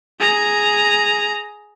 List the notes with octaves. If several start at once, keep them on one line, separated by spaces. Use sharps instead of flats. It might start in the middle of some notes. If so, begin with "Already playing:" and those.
G#4 A#5